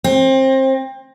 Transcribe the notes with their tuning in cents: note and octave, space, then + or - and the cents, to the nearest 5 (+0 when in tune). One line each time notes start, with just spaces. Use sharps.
C4 +25